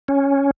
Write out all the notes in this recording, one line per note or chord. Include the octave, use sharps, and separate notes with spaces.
C#4